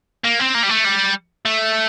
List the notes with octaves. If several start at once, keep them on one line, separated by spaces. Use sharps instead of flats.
A#3
C4
A#3
G3
A3
G3
A3